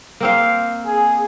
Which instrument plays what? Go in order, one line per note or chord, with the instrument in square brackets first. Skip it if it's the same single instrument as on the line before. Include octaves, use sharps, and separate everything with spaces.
[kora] A#3 C4 F5
[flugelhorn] G#4